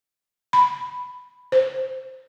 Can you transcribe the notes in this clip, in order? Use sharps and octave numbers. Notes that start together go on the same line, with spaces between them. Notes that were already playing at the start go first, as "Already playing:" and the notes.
B5
C5